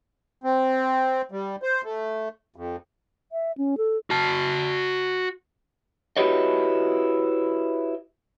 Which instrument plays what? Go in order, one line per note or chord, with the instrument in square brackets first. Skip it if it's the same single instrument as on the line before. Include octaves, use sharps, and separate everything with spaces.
[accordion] C4
G3
C5
A3
F2
[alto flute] E5
C#4
A4
[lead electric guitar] F#4 A5
[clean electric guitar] E4 F#4 G4 B4 C#5 D#5